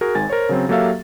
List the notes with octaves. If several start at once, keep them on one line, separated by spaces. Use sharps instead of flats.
F#4 G#4 A#4
G#1 G#2 G#5 A6
A#4 C5 C#5
C#3 F#3 C4
F#3 A#3 G4 A4 E5 F5